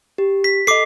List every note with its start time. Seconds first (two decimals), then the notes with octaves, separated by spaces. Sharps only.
0.18 G4
0.44 B6
0.67 A4 D#5 D6 C7